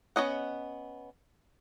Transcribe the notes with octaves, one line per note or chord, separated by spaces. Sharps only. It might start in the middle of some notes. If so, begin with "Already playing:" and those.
B3 C#4 D#5 F#5